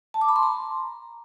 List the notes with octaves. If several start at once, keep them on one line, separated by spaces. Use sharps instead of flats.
A5
D6
B5
C6
A#5